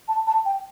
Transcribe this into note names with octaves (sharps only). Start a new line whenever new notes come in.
A5
A5
G5